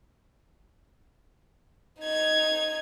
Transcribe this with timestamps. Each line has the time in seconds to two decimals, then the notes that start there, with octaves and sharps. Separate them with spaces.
2.01 D#4 G#6